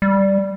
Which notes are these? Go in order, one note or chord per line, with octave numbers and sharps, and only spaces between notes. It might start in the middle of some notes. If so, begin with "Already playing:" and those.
G3